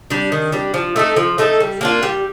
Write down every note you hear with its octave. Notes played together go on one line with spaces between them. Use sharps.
G3 D4
D#3
G3 D4
F3
A3 D#4 A4
F3
A3 D#4 A4
G3
A#3 D4 F4
G3